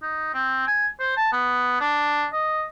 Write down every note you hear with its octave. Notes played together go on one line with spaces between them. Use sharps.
D#4
C4
G#5
C5
A5
B3
D4
D#5